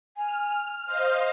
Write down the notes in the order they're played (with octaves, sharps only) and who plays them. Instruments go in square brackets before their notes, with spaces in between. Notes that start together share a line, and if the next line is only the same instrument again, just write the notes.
[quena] G#5 [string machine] F6
[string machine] C5 D#5 F5 [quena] F6